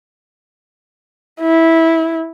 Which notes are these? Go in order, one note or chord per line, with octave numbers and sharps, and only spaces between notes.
E4